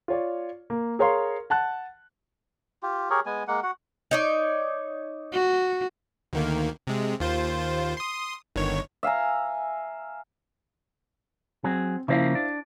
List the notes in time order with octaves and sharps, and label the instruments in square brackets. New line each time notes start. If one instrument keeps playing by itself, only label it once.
[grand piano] F4 C#5 D5
A#3
G#4 A#4 C#5 F5 A#5 C6
F#5 A5 F#6
[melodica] F4 G4
G4 G#4 A#4 C#5
G#3 B3 G#5
G#3 A#3 F#5
F#4 F#5
[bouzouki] D#4 C#5 D5
[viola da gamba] F#4
[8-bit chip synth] D2 D#3 A#3
C3 G#3
D#2 F4 C5
C6 D#6
G1 D#3 C#5
[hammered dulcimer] E5 F5 G#5 A#5
[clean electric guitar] F#3 G#4 [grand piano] C4
[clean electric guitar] C#3 F3 A#3 [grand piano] E4 C5 F5
[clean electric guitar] D4